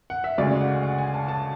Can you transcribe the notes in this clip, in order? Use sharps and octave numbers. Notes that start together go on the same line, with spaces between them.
F#5
E5
D2 C#3 G#3 D5
F#5
F#5
G#5
A5
A5